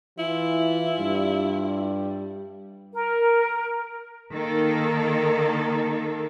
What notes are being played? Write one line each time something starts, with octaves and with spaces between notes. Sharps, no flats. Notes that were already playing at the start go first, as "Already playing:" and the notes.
E3 E4 F4
G2 G3
A#4
D#3 A#3 A4